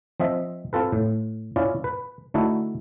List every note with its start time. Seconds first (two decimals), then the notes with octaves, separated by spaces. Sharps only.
0.20 F3 C4 D#5 E5
0.73 C4 F4 A4 B4
0.92 A2
1.56 C#4 E4 F4 D5
1.84 B4
2.34 D3 A3 D#4 E4 F#4